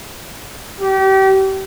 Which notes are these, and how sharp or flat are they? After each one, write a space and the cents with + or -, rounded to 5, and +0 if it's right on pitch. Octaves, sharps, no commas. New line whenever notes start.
G4 -30